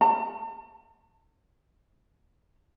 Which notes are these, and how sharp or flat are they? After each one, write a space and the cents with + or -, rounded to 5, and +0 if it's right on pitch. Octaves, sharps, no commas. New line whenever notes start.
A5 +40